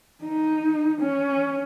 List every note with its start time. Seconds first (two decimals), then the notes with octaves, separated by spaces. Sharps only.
0.24 D#4
1.01 C#4